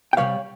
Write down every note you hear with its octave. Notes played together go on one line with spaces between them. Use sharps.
G5
C3 E3 G3 C#5 F5